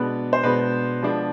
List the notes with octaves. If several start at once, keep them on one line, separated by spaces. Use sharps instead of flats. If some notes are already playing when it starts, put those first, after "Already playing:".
Already playing: B2 G#3 B3 D4 B4
C5
B2 G#3 B3 D4 B4
F3 G#3 B3 D4